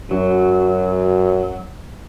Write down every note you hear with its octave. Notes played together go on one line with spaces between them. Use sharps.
F#2 F#3